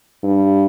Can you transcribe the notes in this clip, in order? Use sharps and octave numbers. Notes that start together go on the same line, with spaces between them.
G2